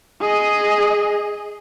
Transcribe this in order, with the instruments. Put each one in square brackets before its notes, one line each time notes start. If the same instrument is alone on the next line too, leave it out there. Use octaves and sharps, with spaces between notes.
[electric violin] G#4 D#5